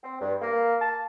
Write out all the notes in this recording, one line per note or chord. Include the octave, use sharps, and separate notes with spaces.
C4
G2
A#3
A5